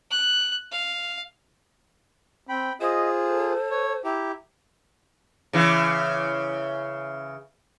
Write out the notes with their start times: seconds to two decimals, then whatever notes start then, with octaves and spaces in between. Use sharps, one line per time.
0.11 F#6
0.72 F5
2.49 C4 G5 B5
2.81 F4 G#4 C5 D#5
3.26 A4
3.71 C#5
4.05 E4 G4 A#5
5.53 C#3 E3